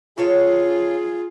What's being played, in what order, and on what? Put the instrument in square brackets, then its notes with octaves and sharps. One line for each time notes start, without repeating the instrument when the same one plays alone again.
[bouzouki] C#3 A4 C#5 [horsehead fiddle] F4 G#4